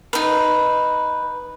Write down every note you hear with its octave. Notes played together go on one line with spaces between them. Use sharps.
D#4 B4